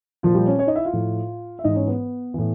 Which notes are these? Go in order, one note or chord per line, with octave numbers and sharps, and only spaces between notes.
A#2 F3 F4
G3 G4
C#4 C#5
C#4 C#5
D#4 D#5
E4 E5
F4 F5
A2 F3
E5
G#2 E3 D#4 D#5
C#4 C#5
B3 B4
A2 E3